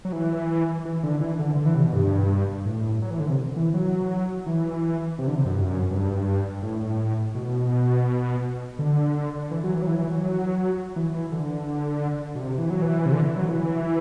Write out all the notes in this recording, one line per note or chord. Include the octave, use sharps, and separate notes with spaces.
F#3
E3
E3
D3
E3
D3
D3
E3
C3
B2
G2
A2
F#3
E3
D3
C3
E3
F#3
E3
C3
D3
C3
F#2
G2
F#2
G2
A2
B2
D3
E3
F#3
E3
F#3
E3
E3
F#3
E3
E3
D3
B2
C3
E3
F#3
E3
C3
D3
E3
F#3
E3